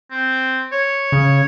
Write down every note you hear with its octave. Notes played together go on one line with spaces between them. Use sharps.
C4
C#5
C#3